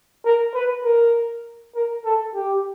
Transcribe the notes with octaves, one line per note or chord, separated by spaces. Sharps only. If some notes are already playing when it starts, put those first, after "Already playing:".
A#4
B4
A#4
A#4
A4
G4